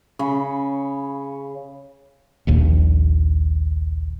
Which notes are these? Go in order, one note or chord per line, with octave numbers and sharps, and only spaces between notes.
C#3 C#5 B5
D#1 A#1 D#2